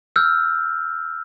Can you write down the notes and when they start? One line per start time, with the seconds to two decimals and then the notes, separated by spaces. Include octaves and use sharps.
0.16 E6 F6 G6